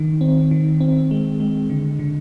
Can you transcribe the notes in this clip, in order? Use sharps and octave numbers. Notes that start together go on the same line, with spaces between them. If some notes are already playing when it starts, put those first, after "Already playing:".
Already playing: D#3
C4
D#3
C4
G#3
G#3
D3
D3